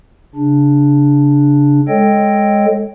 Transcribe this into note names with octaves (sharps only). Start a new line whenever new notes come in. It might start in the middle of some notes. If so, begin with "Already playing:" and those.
C#3 D4
G#3 A4 C#5 D#5 G5